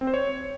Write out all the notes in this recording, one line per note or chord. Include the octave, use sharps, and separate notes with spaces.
C4
C5
C#5